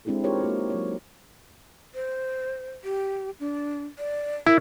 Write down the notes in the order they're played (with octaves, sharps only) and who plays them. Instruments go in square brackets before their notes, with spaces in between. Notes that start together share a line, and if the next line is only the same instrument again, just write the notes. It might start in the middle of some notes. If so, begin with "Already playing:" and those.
[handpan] G#3 C4 D4 E4 G4 A4
D#4 F4 G4 A#4 C5 C#5
A#3 C4 F#4
F#3 C#5
[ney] C5
G4
D4
D5
[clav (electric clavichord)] E4 [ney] A#4